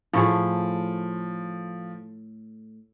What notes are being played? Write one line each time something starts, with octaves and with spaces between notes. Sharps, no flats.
A2 F3 A3 G#4